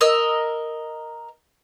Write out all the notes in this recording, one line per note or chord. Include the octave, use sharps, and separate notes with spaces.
A#4 D#5 E6